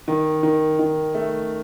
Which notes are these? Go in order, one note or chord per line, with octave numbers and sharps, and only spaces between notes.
D#3
D#3
D#3
A3